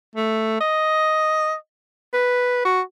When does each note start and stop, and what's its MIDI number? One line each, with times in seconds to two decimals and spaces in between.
0.16 0.59 57
0.60 1.54 75
2.14 2.62 71
2.65 2.81 66